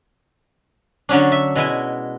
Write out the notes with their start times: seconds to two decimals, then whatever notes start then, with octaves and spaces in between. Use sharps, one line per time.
1.09 D3 F#3 C#4 D4
1.32 E5
1.56 B2 G#3 E4 G#5